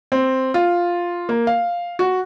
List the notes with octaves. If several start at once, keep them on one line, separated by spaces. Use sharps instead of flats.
C4
F4
A#3
F5
F#4